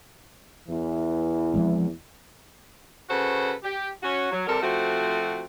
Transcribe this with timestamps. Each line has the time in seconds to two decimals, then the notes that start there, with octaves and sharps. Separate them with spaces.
0.68 E2 E3
1.54 F3 G#3 C4
3.09 C#3 F#4 A4 B4 C5
3.63 G4
4.02 C#4 F#4
4.30 F#3
4.47 C3 G3 A4 A#4
4.62 F3 A3 C4 F#4